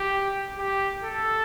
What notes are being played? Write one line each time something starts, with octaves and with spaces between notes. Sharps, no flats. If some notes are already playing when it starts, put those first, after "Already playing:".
Already playing: G4
G4
A4